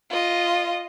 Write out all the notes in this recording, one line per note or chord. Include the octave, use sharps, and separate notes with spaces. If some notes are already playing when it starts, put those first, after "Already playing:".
F4 D#5